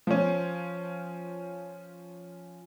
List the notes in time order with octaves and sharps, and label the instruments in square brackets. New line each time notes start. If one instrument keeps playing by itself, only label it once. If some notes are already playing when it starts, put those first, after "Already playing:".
[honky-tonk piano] F3 C#4